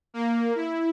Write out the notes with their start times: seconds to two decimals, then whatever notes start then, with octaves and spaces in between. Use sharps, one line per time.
0.14 A#3
0.55 E4